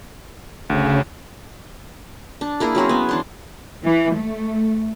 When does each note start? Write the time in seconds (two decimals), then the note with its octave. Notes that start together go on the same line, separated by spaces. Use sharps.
0.70 G1 D2 C#3
2.41 D4
2.60 A#3 E4 G#4 A#4
2.75 F#3 C4 C#4 G#4
2.89 B3 G#5
3.09 E3 D4 C6
3.82 E3
4.15 A3